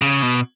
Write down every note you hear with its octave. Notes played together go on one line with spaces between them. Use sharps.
C#3
B2